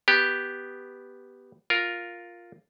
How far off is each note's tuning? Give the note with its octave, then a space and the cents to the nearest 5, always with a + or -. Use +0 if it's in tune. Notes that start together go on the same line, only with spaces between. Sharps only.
B3 +0 G4 +0
F4 +0 A#4 +0